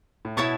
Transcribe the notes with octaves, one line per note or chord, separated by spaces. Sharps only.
A2
B2 E4 C#5 A5 C#6